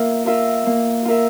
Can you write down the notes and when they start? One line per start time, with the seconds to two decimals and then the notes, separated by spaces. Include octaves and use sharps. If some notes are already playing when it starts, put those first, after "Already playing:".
Already playing: A#3 F4 A#4 E5
0.26 F4 A#4 E5
0.66 A#3
1.05 F4 A#4 E5